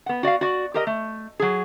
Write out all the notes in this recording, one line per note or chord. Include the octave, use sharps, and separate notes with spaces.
B3 F#5
F#4 D5 E5 F5
F#4 D5
G4 A#4 D#5
A3
F#3 G#4